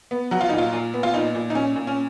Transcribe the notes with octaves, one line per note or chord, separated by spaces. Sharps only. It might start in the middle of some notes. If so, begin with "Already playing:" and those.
B3
F#3 F#4
F4
A#2 D#4
F4
A#2
B3
F4
A#2 D#4
A#2
D#4
A#2 C#4
A#2
C#4